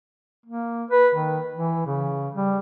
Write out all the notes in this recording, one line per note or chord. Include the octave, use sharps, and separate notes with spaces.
A#3
B4
D#3
E3
C#3
G3